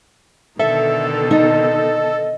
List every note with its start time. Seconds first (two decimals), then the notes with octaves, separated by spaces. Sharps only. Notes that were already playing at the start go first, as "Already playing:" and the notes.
0.59 B2 D3 D#3 A4 E5
1.31 D#4 D#5